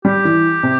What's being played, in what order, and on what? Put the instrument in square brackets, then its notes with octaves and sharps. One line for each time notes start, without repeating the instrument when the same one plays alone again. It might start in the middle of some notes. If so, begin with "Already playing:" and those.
[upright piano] G3 [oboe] G4
[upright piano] E3
C3